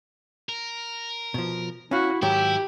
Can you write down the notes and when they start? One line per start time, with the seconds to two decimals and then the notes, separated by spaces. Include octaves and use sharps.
0.49 A#4
1.34 B2 F3
1.91 C#4 E4 F#4 F5
2.22 G#2 D#3 F#3 E4 G4 G5